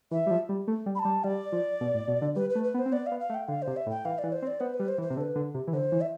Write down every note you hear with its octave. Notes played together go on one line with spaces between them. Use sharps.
E3 E5
G3
F3
G3
A3
G3
B5
A5
G3
G3 D5
F3
B2
A2
B2
D3
G3 B4
B4
A3
B4
B3
C5
C4
B3 D5
F5
B3
F5
A3
G5
D3 F5
C3 C5
E5
A2
G5
E3 F5
E3 D5
C5
C4
D5
B3 C5
B4
G3
C5
E3
C5
C3
D3 C5
B4
D3
C3
E3
D3 C5
E3
E5